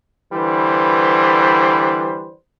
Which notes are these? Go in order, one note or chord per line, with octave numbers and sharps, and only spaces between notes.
D3 E3 G3 B4 C5